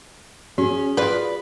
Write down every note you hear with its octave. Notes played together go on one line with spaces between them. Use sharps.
C#4 F#4 G#4
F4 B4 D5